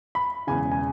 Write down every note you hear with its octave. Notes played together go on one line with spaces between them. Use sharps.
B5
E1 E2 C#3 G#5
G#5